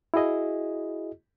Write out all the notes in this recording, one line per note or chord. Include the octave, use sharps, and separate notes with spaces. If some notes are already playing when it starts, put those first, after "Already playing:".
E4 F#4 G#4 D#5